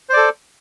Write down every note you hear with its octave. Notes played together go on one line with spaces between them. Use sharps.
A4 C5 D5